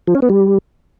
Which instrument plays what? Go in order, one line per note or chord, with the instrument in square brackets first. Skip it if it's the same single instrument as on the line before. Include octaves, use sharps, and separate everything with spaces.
[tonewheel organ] F3
C#4
B3
G3